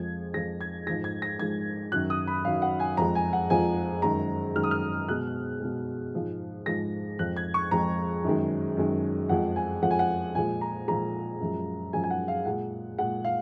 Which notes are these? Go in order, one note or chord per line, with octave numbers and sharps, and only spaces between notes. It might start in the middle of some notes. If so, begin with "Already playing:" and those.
Already playing: F2 F3 G#3 G#6
F2 F3 G#3 A#6
G#6
G#2 F3 G#3 A#6
G#6
A#6
G#2 F3 G#3 G#6
F#2 D#3 F#3 F#6
D#6
B5
F#2 D#3 F#3 F5
F#5
G#5
F2 F3 G#3 A#5
G#5
F#5
F2 F3 G#3 G#5
F#2 D#3 G#3 A#5
F#2 D#3 G#3 F6
D#6
F6
B2 G#3 F#6
B2 G#3
G#2 F3 G#3
G#2 F3 G#3 A#6
F2 F3 G#3 F#6
G#6
C#6
F2 F3 G#3 A#5
F#2 D#3 G#3
F#2 D#3 G#3
F2 F3 G#3 F#5
G#5
F2 F3 G#3 F#5
G#5
F#5
A#2 F3 G#3 G#5
A#5
A#2 F3 G#3 A#5
F#2 F3 G#3
F#2 F3 G#3 G#5
G#5
F#5
F5
A#2 G#3 F#5
A#2 G#3 F#5
F5